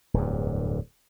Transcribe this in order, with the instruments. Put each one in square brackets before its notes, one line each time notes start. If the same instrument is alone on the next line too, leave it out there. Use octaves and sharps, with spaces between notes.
[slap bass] D1 E2 G2